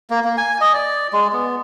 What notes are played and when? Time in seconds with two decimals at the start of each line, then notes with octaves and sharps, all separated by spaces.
0.10 A#3
0.24 A#3
0.37 G#5
0.61 D#5
0.74 D5
1.13 G#3
1.33 B3